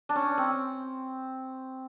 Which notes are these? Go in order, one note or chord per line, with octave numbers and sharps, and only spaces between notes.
D4
C#4
C4